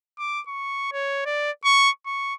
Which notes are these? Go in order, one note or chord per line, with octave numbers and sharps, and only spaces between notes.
D6
C#6
C#5
D5
C#6
C#6